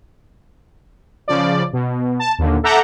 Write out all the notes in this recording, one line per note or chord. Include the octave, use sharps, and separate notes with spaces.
C#3 F3 D5
B2
A5
D#2 A#2 D3
A4 E5 F#5 A#5 D6 G6